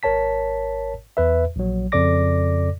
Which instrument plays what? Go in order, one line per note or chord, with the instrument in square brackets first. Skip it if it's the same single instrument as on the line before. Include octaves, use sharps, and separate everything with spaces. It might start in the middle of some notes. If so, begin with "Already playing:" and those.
[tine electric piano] G#1 A#4 C#5 A5 B6
E2 B4 E5
A#1 F#3
F2 C#3 A4 D5 D6 A#6